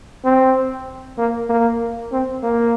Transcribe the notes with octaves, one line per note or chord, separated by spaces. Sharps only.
C4
A#3
A#3
C4
A#3